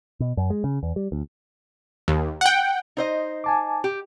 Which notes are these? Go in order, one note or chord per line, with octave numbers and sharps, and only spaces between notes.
B2
F#2
G#3
C#3
E2
G3
D2
D#2
F#5 G5
D#4 C5 D#5
G#5 A5 D6
G4